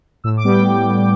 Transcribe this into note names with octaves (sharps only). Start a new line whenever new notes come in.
A2 E6
D6
G3 B3
G5